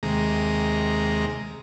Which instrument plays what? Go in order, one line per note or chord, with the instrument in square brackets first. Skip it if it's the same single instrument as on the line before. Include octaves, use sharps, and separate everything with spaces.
[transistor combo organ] D#2 C3 G#3 A#5